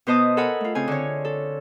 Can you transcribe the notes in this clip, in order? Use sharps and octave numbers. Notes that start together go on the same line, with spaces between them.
B2 B3 C5 D#5 A5 D#6
A4 A#4 F#5 G#5 B5
A3 F4
C#3 C4 F4 G#5
D3 C#5
A4